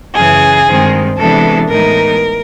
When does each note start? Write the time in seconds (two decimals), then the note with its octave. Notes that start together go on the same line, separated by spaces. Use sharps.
0.14 F#2 C#3 E3 G#4
0.66 G2 D#3 G#3 C4
1.17 C3 E3 G#3 B3 D4 A4
1.69 A2 E3 G#3 B3 D#4 A#4